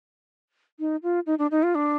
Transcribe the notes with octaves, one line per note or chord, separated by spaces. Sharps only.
D#4
F4
D#4
D4
D#4
F4
D4